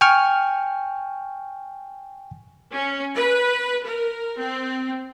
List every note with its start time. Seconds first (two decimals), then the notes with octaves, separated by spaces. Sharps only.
0.01 G5 G#5 C#6 F6
2.73 C#4
3.16 B4
3.85 A#4
4.37 C4